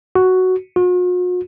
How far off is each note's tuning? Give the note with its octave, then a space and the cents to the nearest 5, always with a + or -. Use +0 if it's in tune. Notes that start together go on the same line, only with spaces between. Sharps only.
F#4 +5
F#4 -45